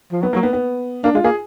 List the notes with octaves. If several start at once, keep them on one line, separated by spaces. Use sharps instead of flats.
F3
F#3 B3
F#3 A#3
B3
B3
A#3 D4
G#3 F4
A#3 G#4